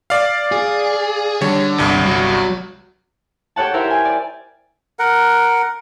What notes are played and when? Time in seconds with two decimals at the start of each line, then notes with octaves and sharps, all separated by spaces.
0.10 D5 F5
0.52 G#4
1.41 D3 G3 C#5
1.78 G1 C2 G2
2.06 F#3
3.56 G4 A4 C#5 F#5 A5
3.74 E4 G4 A#4 C5 C#5 E5
3.88 G5 G#5
4.05 D5
4.99 A#4 F#5